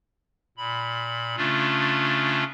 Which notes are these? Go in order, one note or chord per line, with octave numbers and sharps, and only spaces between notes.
A#2 B5
C#3 A3 C#4 D4 F4